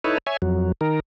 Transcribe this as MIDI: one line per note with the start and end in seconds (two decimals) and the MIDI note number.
0.04 0.18 63
0.04 0.18 64
0.04 0.18 69
0.04 0.18 71
0.04 0.18 73
0.27 0.37 73
0.27 0.37 76
0.27 0.37 80
0.42 0.72 41
0.42 0.72 54
0.81 1.00 51
0.81 1.00 70